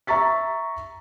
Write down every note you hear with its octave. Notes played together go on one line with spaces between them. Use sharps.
E5 A#5 C#6 A6 B6